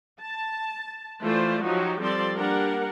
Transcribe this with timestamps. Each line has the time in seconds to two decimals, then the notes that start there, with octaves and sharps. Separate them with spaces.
0.21 A5
1.21 E3 A3 F4 C5 D5
1.63 F3 F#3 D#4 F#4 G4
2.01 F3 G3 C4 A4 D5 C6
2.35 G3 A#3 D4 A#4 F#5